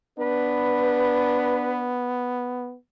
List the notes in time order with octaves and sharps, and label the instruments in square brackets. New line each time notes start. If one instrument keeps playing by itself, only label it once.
[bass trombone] B3 [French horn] D4 [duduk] B4